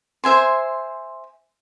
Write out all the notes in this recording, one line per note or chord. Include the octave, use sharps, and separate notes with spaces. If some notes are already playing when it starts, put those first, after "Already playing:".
C5 E5 G#5 C6